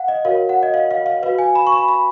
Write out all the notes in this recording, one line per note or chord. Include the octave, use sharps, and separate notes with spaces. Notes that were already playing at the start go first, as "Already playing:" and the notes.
Already playing: F5 F#5
D#5
F#4 A#4 C#5 F5
F#5
D#5
F5
F5
F5
F#4 B4 F5
G#5
B5
C#6
B5
B5